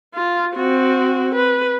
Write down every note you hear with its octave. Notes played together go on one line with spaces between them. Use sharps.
F4
C4 F#4
B4